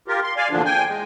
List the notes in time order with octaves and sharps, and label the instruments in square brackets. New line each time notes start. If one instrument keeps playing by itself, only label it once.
[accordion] F4 G4 A#4
C6
D5 F5 G#5
E2 A#2 D3 F3 D4
G5 G#5
G#3